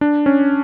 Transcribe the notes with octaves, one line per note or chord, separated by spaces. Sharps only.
D4
C#4